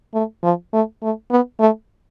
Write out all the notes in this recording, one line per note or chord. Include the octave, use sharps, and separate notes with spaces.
A3
F3
A3
A3
B3
A3